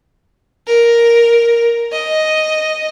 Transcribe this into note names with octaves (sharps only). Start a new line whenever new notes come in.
A#4
D#5